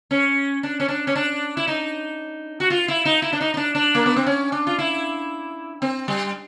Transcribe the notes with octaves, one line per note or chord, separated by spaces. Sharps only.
C#4
D4
C#4
D4
C#4
D4
E4
D#4
F#4
F4
E4
D#4
E4
D4
D#4
D#4
D4
D4
A#3
B3
C4
C#4
D4
F4
E4
C4
G3